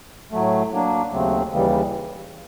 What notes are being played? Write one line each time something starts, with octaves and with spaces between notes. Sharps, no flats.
A2 F#3 A3
F#3 A#3 D4
D#2 C#3 F#3 A3 C4
D#2 C#3 E3 G3